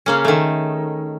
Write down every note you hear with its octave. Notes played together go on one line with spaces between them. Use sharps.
C#3 A#3 C#4
D#3 A3